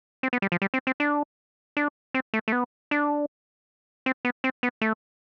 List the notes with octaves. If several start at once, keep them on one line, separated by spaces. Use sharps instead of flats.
C4
B3
G3
F3
G3
C4
C4
D4
D4
C4
A3
A3
B3
D4
C4
B3
C4
B3
A3